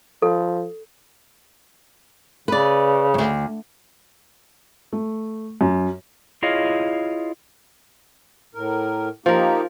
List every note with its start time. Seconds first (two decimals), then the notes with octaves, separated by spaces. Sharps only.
0.22 F3 A4
2.48 C#3 B4 D5
3.14 D2 G2
4.92 A3
5.61 F#2
6.42 E4 F4 G#4 C#5 D#5 F5
8.55 A2 A#4
9.26 F3 A#3 D#4 G4 A#4